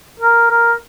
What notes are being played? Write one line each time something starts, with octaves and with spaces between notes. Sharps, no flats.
A#4
A#4